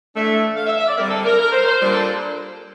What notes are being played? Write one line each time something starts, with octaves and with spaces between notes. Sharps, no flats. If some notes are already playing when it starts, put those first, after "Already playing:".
E3 A3 D4 E5
F5
E5
E5
D5
D3 G3 C4 A#4
A4
A#4
A#4
C5
C5
A#2 G3 A#3 D4 C5
A4